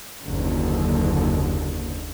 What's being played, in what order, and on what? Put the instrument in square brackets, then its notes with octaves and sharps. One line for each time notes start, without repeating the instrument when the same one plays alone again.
[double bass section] F#1 D#2 D3